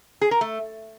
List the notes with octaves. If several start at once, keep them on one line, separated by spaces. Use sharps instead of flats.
G#4
A#4
A3